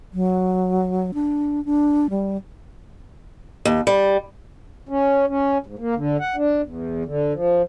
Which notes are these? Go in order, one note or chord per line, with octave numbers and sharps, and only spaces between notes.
F#3
D4
D4
G3
D#2
G3
C#4
C#4
G#2
A#3
D3
F#5
D4
E2
D3
F3